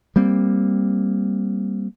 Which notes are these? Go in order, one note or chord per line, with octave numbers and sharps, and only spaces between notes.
G3 A#3 C4